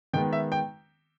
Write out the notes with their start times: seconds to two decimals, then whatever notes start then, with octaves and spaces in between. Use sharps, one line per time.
0.13 D#3 G#3 B3 G5
0.33 E5
0.52 G5